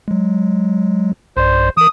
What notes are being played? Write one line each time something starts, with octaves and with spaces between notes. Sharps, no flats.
F#3 G#3
B1 G2 C5 D5
E3 A#4 D#6